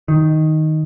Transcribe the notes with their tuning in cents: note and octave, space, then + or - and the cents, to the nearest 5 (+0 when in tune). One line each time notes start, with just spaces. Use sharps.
D#3 +5